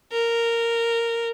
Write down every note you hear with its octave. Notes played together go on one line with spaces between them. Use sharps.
A#4